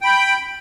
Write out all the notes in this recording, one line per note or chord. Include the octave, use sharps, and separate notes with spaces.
G5 B5 G6